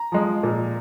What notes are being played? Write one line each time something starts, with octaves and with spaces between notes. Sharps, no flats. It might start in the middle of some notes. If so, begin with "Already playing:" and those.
Already playing: A#5
F3 G#3
A#2